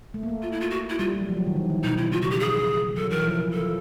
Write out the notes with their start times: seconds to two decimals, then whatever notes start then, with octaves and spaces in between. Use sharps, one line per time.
0.14 A3
0.23 A#3
0.28 A3
0.42 F4
0.52 E4
0.61 F4
0.71 F#4
0.90 E4
0.99 G3 F4
1.13 G3
1.21 F#3
1.29 F3
1.37 F#3
1.47 D#3
1.56 E3
1.70 D#3
1.84 B2 D#4
1.98 E4
2.12 C#3 F4
2.22 F#4
2.31 G4
2.40 G#4
2.97 F#3 A4
3.11 E3 A#4
3.25 F3
3.39 F3
3.53 F3 A4